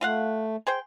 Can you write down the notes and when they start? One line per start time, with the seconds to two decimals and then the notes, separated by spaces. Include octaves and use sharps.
0.01 A3 F4 F5 F#5
0.67 G#4 C5 G5